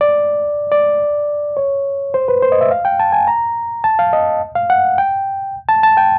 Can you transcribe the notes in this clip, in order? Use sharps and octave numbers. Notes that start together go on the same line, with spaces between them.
D5
D5
C#5
C5
B4
C5
D#5
E5
F5
G5
A5
G#5
A#5
A5
F5
D#5
F5
F#5
G5
A5
A5
G5